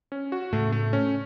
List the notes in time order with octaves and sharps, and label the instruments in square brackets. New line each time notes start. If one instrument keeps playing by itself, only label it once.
[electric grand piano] C#4
F#4
[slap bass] A2 C#3 [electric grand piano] A3
[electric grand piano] A3
C#4